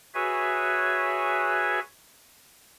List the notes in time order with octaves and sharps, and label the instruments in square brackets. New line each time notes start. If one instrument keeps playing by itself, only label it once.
[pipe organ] F#4 G#4 B4 C#5 E5 G#5